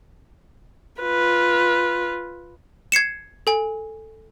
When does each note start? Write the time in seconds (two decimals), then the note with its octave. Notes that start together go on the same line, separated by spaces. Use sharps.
1.02 F4 B4
2.92 G#6 C7 C#7 E7
3.47 A4 G#5